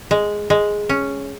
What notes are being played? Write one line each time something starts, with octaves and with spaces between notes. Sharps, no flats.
G#3
G#3
C#4